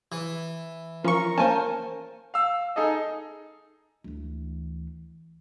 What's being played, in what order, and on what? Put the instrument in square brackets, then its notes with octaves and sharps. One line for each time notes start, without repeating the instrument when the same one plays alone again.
[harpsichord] E3
[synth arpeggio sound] F3 C#6 [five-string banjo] C#4 [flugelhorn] A#4
[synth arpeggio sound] A#3 C#4 [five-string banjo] C5 G#5 A5
[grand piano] F5 E6
D#4 G#4 A4 D#5
[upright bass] D2 E3